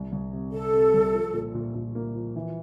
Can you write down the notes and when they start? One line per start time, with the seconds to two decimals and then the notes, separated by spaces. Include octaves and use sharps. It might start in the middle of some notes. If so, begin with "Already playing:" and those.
Already playing: C2
0.12 C2
0.33 C3
0.53 C3 A4
0.73 C3
0.94 C2
1.14 F3
1.34 A#2
1.54 A#2
1.75 A#2
1.95 A#3
2.15 F3
2.36 E3